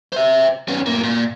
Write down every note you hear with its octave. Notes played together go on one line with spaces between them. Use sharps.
C5 E5
B3 C#4
A2 A#3
A#2